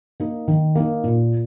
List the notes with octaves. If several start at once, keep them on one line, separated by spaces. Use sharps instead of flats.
A#3 D#4
D#3
A#3 D#4
A#2